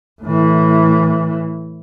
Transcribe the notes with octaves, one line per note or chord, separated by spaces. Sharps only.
A2 E3